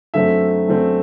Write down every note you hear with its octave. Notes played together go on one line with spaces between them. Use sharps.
F#2 D3 A3 C4 E5
F#2 D3 A3 C4